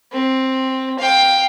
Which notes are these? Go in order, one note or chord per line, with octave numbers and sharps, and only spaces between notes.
C4
F5 G5